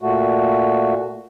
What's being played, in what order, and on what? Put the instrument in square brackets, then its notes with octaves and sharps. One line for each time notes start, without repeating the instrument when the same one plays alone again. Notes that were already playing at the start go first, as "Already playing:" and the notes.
[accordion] A#2 A3 F#4